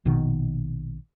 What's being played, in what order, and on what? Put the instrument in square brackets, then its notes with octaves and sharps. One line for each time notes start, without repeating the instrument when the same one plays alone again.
[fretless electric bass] A#1 B2 D#3